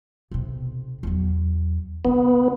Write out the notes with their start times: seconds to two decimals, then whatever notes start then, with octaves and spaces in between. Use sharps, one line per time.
0.31 B1 C3
1.03 E2 F#3
2.05 C#3 B3 D#4